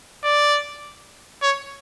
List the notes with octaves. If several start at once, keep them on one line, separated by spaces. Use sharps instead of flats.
D5
C#5